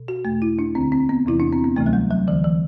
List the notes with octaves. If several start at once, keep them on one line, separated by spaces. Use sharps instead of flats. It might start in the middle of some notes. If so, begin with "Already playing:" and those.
Already playing: B2
F#4
E2 B2 A3
E4
D4
D2 D3 C4
C4
B3
E2 C3 E3 E4
D4
C4
B3
D2 C3 E3 A3
F#3
G3
F#3
D2 D3 E3
E3